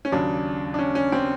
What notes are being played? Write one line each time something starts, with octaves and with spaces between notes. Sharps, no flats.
C#4
D#2 C#3 F#3 D4
D4
C#4
C#4
C4